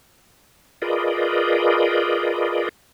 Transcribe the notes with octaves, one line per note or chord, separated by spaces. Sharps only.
F4 G#4 A#4 B4 D5 D#5